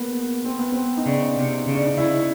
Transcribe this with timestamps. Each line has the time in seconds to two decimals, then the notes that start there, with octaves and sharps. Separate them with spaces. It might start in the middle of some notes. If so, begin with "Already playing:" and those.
Already playing: A#3 B3
0.45 C4
0.59 B3
0.72 C4
0.97 D#4
1.06 C#3 D4
1.36 C3
1.67 C#3
1.74 D4
1.86 D#4
1.97 C#3 E4